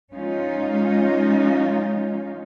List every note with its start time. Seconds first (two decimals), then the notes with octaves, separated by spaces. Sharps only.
0.11 F3 G#3 C#4 D#4 F4